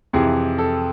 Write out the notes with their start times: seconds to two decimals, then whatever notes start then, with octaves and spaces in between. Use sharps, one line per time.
0.13 F2 C3 E3 G#4
0.58 A4